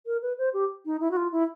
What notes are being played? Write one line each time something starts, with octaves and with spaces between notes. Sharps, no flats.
A#4
B4
C5
G4
D#4
E4
F#4
F4
E4